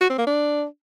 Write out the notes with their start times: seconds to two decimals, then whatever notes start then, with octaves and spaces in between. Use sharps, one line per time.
0.01 F#4
0.10 C4
0.18 A#3
0.27 D4